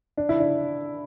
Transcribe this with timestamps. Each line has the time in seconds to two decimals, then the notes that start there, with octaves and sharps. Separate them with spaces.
0.17 D4
0.29 E4
0.40 D4